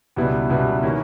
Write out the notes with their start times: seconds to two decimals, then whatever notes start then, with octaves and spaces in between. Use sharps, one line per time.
0.16 C#2 B2 G3 B3 E4
0.50 C#2 B2 G3 B3 E4
0.83 D#3 A#3 C#4 E4